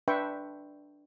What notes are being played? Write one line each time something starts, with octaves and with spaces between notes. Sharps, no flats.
D4 B4 E5 G5 C6 C#6